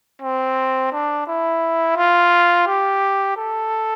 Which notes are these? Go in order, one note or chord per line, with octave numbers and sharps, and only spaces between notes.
C4
D4
E4
F4
G4
A4